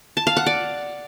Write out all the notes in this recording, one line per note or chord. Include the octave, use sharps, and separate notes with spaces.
A5
F5
F#5
D5